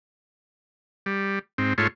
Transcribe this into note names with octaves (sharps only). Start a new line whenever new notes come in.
G3
G#2 C4
G#2 A3 F4 C#5